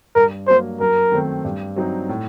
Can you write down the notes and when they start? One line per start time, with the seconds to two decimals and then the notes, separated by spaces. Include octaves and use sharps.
0.15 G2 A#4
0.47 F#3 A#3 C5
0.80 F#2 A#4
1.12 D#3 A3 C4
1.44 G2
1.76 F#3 C4 D#4
2.09 A2